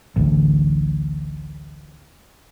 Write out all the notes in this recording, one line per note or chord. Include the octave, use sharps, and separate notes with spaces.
A1 D2